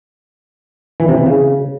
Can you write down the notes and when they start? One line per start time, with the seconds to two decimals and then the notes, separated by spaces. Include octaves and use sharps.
1.00 E3
1.08 C3
1.17 E3
1.26 C#3